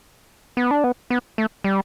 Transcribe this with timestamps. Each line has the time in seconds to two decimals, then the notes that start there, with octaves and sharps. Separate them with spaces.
0.57 B3
0.71 D4
0.84 B3
1.10 B3
1.38 A3
1.64 G3